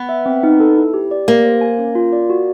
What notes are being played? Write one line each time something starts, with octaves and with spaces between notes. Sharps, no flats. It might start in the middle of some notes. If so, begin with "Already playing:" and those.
Already playing: B3
E5
C4
D#4
A4
E4
G4
D5
A#3 G4
C5
G#5
C#4
F4
D5
F#4